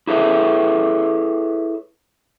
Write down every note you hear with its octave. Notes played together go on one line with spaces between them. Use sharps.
E4 G#4 A4 B4 C#5 E5